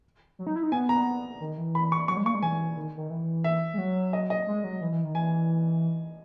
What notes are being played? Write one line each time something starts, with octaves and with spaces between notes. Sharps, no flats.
F#3
D#4
E4
D#4
B3 G#5
A#5
D#3
E3
B5
C#6
F#3 C#6
G#3
A#3 C#6
G#3
E3 G#5
D#3
D#3
E3
E5
G#3
F#3
D#5
D#5
G#3
F#3
E3
E3
D#3
E3 G#5